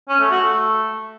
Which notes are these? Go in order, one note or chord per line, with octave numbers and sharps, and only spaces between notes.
C#4
A3
F#4
A3